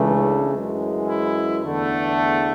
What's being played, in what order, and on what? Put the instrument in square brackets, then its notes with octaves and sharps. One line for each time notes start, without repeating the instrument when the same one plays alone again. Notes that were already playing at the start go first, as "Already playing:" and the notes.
Already playing: [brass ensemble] C#2 C#3 E3 A3 D4
F#2 E3 G#3
E4
E2 D3 A3